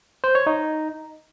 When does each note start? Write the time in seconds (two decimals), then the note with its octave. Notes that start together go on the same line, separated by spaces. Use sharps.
0.24 C5
0.35 C#5
0.47 D#4